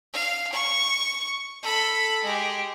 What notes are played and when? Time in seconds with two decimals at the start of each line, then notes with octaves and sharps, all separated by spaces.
0.13 F5
0.52 C#6
1.62 A4 B5
2.24 G#3 G4